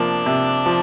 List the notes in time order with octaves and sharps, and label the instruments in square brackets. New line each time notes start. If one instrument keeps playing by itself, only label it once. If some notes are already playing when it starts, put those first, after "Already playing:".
Already playing: [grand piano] C3 F3 A#3 [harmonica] D4
[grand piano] C3
F3